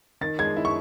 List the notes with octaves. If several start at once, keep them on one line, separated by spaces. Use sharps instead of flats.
D#3 A6
G#3 G#6
E4
C#6